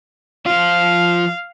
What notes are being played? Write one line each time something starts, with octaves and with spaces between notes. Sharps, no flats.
F3 F4 F5